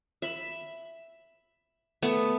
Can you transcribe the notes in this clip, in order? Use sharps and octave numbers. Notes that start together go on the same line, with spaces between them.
E5 B5
A3 B3